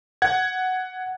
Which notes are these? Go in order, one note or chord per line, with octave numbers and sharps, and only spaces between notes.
F#5 G#6